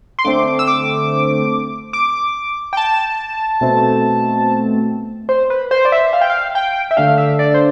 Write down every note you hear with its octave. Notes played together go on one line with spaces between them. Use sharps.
C6
D3 A3 C4 D6
E6
D6
D6
G5
A5
B2 A3 C4
C5
B4
C5
D5
E5
F5
G5
F5
G5
E5
D3 A3 D4 F5
E5
D5
C5